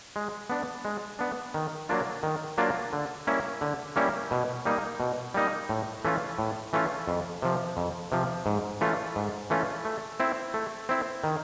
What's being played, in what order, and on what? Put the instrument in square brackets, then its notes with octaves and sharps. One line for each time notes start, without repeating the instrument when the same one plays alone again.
[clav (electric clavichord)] G#3
B3 D4
G#3
B3 D4
D#3
F#3 A#3 D4 F4
D#3
F#3 A#3 D4 F4
D3
G3 A#3 C#4 E4
D3
G3 A#3 C#4 E4
B2
G3 A#3 D#4
B2
G3 A#3 D#4
A2
E3 A3 C#4 F4
A2
E3 A3 C#4 F4
F2
C3 F3
F2
C3 F3
G#2
E3 A3 C#4 F4
G#2
E3 A3 C#4 F4
A3
C4 E4
A3
C4 E4
D#3